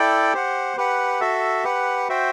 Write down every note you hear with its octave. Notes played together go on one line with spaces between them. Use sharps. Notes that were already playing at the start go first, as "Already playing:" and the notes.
Already playing: E4 A4 D5 G5
G4 C5 F#5
G4 B4 F#5
F#4 A4 E5
G4 B4 F#5
F#4 C5 E5 G5